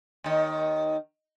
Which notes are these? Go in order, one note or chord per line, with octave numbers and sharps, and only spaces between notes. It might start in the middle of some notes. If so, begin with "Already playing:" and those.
D#2 D#3